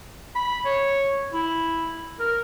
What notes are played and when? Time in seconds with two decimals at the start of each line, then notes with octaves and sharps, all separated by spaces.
0.35 B5
0.65 C#5
1.33 E4
2.20 A#4